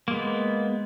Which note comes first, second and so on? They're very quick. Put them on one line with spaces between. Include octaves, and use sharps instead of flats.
A#3 G#3 B3